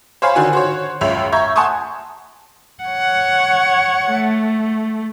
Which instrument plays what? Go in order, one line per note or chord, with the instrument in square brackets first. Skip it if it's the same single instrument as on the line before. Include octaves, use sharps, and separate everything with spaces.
[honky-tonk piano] C5 C#5 F5 G#5 B5
D3 D#3 F#4 G#5
F#4 C5 C#5
C#2 F#2 C#5 E5 F7
E5 A#5 C#6 G6 G#6
F#5 G#5 A5 C6 C#6 D#6
[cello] C#5 F#5
A3